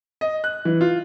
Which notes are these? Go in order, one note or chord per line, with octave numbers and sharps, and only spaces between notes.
D#5
F#6
E3
F4